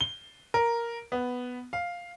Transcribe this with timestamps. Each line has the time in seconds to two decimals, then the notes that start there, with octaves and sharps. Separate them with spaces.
0.01 G7
0.54 A#4
1.12 B3
1.73 F5